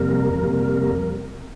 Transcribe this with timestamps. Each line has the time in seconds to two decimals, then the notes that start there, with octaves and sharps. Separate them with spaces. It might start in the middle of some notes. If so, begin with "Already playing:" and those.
Already playing: F2 C3 G3 A#3 A#4
0.42 F2 C3 G3 A#3